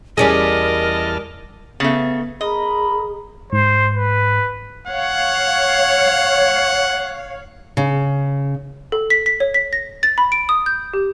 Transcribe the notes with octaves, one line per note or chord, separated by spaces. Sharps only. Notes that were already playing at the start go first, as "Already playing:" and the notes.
E2 G3 C#4 G#4 A#4 D#5 A5 F6
C#3 A3 B3
G#4 A#4 D#5 B5
G#2 C5
B4
C#5 F5 F#5
C#3
A4
B6
B6
C#5
B6
A#6
A6
B5
D7
D#6
G6
G4